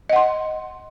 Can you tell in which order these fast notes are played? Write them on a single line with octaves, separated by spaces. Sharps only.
D#5 F#5 C6